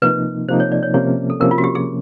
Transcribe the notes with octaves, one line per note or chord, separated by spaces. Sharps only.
C3 F3 A#3 D#4 B4
C3 F3 A#3 D#4 C5
C#5
D5
C#5
C3 F3 A#3 C#4 C#5
A4
C3 F3 A#3 C#4 A#4
F4
F#4
G4
G#4